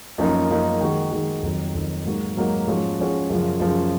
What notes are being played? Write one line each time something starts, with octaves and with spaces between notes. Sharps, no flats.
F#2 F3 A#3 D#4
F#2 F3 A#3 D#4
D#3 G#3 D#4 F#4
D#3 G#3 D#4 F#4
F2 D#3 F#3
F2 D#3 F#3
G#2 F#3 A#3 D#4 F#4
G#2 F#3 A#3 D#4 F#4
G#2 F3 G#3 C#4 F#4
G#2 F3 G#3 C#4 F#4
F#2 C#3 F3
F#2 C#3 F3